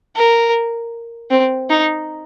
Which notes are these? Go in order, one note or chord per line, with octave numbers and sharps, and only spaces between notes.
A#4
C4
D#4